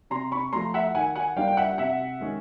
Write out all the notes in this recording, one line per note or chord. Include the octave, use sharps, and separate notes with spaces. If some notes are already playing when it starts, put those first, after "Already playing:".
C3 A#5 C6
B5 C#6
F3 A3 A#5 C6
E5 F#5
D#3 F#5 G#5
F#5 G#5
G3 A#3 D4 F4 F5 G5
G5
E5 F#5
C3 E5 F#5
D#3 G#3 C#4